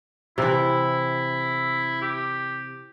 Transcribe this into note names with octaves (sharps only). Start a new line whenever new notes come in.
C3 E3 E4
G4